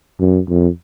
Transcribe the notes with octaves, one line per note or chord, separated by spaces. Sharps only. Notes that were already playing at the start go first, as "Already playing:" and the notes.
F#2
F2